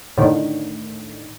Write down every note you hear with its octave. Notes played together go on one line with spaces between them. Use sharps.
A2 D3 D#3